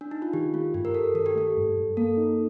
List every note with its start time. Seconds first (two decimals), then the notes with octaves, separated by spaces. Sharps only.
0.01 D4
0.11 D#4
0.22 F4
0.33 D#3 G4
0.53 A3 F4
0.74 G2 G4
0.85 A#4
0.94 G2 A4
1.15 D#3 A4
1.26 G4
1.35 A3 A4
1.57 G2
1.77 G2
1.97 A#3 A4
2.17 D#4